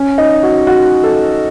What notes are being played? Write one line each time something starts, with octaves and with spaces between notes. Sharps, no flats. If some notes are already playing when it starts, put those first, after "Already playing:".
Already playing: C#4
D#4
F#4
F#4
A4